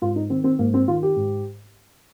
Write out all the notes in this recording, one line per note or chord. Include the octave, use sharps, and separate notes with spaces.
G#2 F4
D#4
D#3 C4
C4
G#2 A#3
C4
D#3 F4
G4
G#2